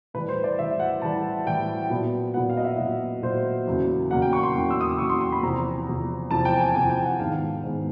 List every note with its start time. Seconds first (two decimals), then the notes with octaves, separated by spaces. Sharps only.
0.14 A2 E3 G3 B4
0.29 C5
0.44 D5
0.59 A2 E3 G3 E5
0.80 F#5
1.02 A2 E3 G3 A5
1.46 A2 E3 G3 G5
1.90 A#2 F#3 B3
2.34 A#2 F#3 B3 F#5
2.50 F5
2.57 D#5
2.64 E5
2.78 A#2 F#3 B3
3.22 A#2 F#3 B3 C5
3.67 E2 C#3 F#3 A#3
4.11 E2 C#3 F#3 A#3 F#5
4.22 G5
4.33 C#6
4.43 C6
4.55 E2 C#3 F#3 A#3
4.70 E6
4.81 D#6
4.89 D6
4.98 E2 C#3 F#3 A#3 C#6
5.09 C6
5.21 C6
5.32 B5
5.42 E2 C3 F3 A#5
5.88 E2 C3 F3
6.31 E2 C3 F3 A5
6.45 G5
6.56 G#5
6.61 G5
6.75 E2 C3 F3 G#5
6.90 G5
7.05 F#5
7.20 G#2 D#3 G#3 B3 F5
7.63 G#2 D#3 G#3 B3